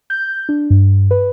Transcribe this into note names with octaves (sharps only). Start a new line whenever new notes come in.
G6
D4
G2
B4